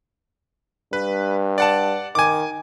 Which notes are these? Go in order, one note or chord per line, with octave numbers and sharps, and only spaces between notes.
G2 B4
D5 F#5 A5
D#3 G#5 D6